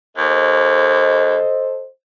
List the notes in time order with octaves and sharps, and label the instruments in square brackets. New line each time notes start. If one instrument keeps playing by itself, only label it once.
[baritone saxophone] D#2 [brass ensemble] A4 C5 D#5